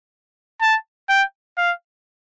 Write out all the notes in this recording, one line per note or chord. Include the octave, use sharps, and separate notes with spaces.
A5
G5
F5